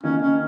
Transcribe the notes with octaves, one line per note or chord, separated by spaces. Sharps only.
D#3 A#3 C#4 D#4
C#4